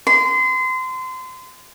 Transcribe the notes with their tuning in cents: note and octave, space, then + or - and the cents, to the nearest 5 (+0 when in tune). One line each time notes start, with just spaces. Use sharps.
C6 -30